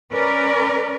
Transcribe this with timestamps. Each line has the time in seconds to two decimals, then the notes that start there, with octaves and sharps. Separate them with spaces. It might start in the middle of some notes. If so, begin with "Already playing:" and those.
0.12 C#4 A#4 B4 D5